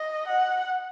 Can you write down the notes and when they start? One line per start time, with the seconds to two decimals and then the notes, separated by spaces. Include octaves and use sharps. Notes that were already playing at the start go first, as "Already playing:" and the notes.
Already playing: D#5
0.28 F#5